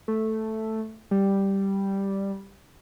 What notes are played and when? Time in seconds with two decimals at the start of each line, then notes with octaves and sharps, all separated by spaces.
0.08 A3
1.11 G3